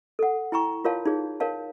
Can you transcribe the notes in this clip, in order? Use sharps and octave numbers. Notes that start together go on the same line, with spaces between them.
A4 F#5
E4 G5 A#5 C#6
F4 A#4 C#5 F5 A5
D#4 F4 G#4 C#5
A#4 C#5 F5 A5